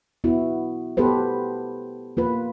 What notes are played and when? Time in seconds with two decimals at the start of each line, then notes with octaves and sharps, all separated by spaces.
0.24 B3 E4 F#4
0.97 B3 G4 A4 B4 C5
2.17 A#3 F4 B4